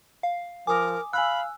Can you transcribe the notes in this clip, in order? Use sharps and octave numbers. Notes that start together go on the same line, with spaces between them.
F5
F3 A#4 G#5 D6 D#6
F5 G#5 B5 E6 F#6